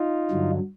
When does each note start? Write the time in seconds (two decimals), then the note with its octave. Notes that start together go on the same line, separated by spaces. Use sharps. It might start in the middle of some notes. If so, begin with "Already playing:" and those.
Already playing: D#4 F4
0.31 G2 D3 F#3